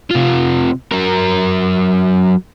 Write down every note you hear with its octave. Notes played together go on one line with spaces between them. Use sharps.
C3 F4
F#3 A#4